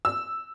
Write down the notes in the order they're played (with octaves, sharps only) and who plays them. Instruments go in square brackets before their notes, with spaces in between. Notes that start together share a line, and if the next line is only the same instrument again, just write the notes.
[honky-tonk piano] E6